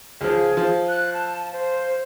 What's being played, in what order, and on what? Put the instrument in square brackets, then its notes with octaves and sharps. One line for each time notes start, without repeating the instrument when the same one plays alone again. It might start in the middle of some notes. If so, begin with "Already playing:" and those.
[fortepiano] C#2 F3 [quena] G#4
[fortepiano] F3
[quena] F#6
A5
C5